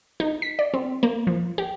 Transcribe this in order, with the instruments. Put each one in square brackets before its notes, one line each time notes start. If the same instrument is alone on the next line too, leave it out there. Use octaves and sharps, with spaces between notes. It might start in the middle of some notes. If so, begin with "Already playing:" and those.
[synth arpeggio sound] D#4
B6
D5
C4
A#3
F3
G4